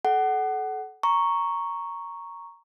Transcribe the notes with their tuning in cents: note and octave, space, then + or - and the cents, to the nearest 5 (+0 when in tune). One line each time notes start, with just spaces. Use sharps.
A4 -30 F#5 +20
A#5 +0 C#6 +0